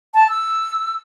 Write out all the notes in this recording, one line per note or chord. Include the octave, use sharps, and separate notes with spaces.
A5
E6